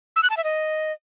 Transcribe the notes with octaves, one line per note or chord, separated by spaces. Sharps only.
E6
F#6
A5
E5
D#5